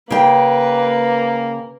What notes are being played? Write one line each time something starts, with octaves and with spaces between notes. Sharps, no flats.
C#3 A#3 B4 G5